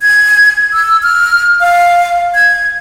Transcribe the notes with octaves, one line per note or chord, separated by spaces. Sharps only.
G#6
E6
F6
F5
G#6